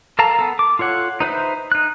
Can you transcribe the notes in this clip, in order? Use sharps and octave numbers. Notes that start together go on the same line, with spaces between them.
A4 A#4 F5 A5 A#5
B3 A4
D6
F4 A4 C#5 F#5
D#4 B4 C5 E5
D#4 F#6